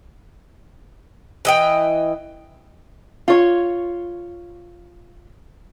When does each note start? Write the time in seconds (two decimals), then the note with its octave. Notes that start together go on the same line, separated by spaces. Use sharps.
1.45 E3 D#5 G5
3.28 F4 C#5